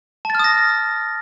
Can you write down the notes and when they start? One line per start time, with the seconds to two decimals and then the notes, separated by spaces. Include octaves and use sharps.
0.25 A5
0.30 A6
0.35 F6
0.39 D#6
0.44 A#6